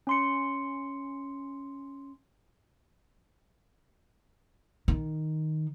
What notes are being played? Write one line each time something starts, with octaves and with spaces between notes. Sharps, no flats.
C#4 C6 C#7
D#3